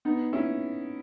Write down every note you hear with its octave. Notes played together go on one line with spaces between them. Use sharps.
B3 D#4
C#4 E4